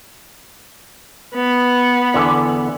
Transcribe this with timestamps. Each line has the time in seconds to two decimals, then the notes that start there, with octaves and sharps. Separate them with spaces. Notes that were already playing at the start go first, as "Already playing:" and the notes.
1.35 B3
2.14 E2 D3 G#5